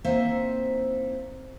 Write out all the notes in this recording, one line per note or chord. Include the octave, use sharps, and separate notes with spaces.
A#3 C4 D#4 E4 C5 E5